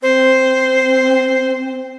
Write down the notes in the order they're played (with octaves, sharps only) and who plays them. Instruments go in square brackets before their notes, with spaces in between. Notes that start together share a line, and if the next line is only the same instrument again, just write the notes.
[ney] C4 [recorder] C5